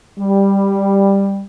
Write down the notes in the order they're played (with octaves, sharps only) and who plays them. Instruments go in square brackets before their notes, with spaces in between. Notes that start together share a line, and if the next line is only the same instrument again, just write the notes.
[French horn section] G3